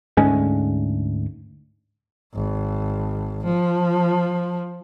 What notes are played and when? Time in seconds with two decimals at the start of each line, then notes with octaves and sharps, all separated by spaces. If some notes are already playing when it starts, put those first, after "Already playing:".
0.17 D2 G#2 G#3 C#4
2.34 G#1
3.44 F3